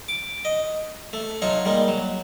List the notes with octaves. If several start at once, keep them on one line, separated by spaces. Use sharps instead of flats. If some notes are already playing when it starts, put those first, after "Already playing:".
D6
D#5
A3
F#3 D#4 F4 C#5
G3 G#3 A#3 D#4
F#3